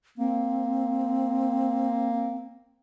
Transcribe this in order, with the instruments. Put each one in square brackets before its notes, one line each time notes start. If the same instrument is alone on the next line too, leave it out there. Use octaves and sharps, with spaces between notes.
[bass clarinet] A#3 [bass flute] C4